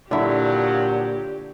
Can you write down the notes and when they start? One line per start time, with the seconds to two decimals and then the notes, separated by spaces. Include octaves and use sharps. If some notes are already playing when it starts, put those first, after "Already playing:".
0.11 G2 A#2 D3 F3 F#3 E4 G4